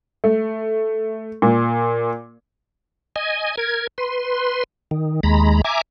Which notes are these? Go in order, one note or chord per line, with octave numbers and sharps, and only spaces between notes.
A3
A#2
D#5 G#5
A#4 G#6
B4 C6
D#3
D#2 G#3 A#5 B5
E5 G#5 A#5 D6